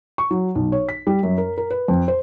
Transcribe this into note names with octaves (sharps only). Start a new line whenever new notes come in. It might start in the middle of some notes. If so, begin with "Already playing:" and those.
C#6
F#3
B1
C#5
B6
G3
F#2
A#4
A#4
B4
F2
C5